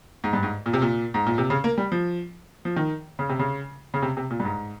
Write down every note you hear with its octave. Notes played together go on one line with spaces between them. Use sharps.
G#2
G2
G#2
A#2
C3
A#2
G#2
A#2
C3
C#3
A#3
G3
F3
F3
D#3
C#3
C3
C#3
C#3
C3
C3
A#2
G2
G#2